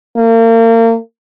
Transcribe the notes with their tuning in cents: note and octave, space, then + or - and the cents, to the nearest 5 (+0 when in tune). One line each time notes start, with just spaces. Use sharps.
A#3 -35